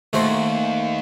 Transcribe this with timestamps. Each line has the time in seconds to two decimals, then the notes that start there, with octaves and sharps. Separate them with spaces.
0.13 D#2 A3 F#4 C5